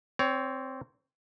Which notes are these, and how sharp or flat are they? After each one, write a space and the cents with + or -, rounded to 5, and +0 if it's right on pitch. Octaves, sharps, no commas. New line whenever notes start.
C4 +0 C#5 +30